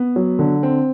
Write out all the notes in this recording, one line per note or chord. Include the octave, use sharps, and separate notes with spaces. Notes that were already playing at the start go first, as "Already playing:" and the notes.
Already playing: B3
F#3
D3
C4